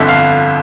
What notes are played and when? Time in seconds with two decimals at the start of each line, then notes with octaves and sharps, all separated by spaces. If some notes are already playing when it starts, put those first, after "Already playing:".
Already playing: G1 F2 D3 E5
0.09 F5